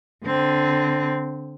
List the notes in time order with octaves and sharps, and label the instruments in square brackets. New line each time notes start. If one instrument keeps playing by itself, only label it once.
[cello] D3 C4